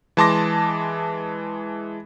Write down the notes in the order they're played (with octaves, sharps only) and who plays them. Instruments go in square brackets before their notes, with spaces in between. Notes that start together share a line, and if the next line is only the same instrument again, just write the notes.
[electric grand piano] E3 G#3 A5 C6 D6 A#6